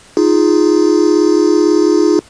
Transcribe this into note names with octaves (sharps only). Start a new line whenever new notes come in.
D#4 F4 G#4